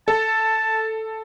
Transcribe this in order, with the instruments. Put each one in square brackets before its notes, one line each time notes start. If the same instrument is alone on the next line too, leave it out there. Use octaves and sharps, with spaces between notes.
[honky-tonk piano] A4 [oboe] A5